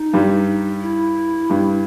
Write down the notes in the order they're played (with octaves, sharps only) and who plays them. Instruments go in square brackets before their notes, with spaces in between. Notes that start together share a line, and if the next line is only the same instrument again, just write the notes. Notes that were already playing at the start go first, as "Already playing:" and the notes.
Already playing: [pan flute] D#4
[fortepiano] G2 G3
[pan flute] E4
[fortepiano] G2 G3